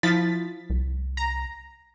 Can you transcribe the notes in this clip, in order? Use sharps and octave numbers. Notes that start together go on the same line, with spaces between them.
F3 E4 A6 B6
C2
A#5